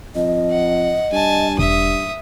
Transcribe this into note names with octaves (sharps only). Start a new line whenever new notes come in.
F2 D#5
F#5
G2 G#5 A5
E1 E5 D#6